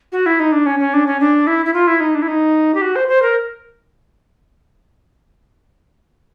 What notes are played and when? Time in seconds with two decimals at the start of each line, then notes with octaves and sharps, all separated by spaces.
0.12 F#4
0.26 E4
0.40 D#4
0.52 D4
0.66 C#4
0.79 C#4
0.94 D4
1.07 C#4
1.20 D4
1.47 E4
1.65 E4
1.74 F4
1.87 E4
2.00 D#4
2.15 D4
2.22 E4
2.28 D#4
2.75 G4
2.82 F#4
2.96 C5
3.08 C5
3.22 A#4